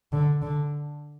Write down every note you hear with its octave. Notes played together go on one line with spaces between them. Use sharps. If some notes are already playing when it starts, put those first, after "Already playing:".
D3
D3